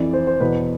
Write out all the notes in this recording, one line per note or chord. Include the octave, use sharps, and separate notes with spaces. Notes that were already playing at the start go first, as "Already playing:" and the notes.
Already playing: F2 E3 D5
C5
C5
E2 B2 B4